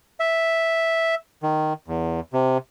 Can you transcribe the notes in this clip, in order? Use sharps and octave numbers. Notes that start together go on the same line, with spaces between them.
E5
D#3
E2
C3